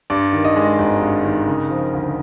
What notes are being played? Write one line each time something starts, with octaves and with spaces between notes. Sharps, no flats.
G2 D5
D#3
D#5
G#3
G#1
G2
D#3
C#3
F3
D2